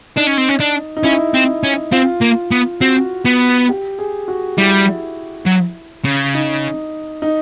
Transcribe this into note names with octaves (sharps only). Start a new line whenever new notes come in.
D4 D#4
C#4
C4
C#4
D4
D#4
C#4 E4
C4
C#4
C4 F4
A#3
B3
C4 F#4
B3
G4
G#4
F#4
G3 E4
F#3
C#3
D#4
D#4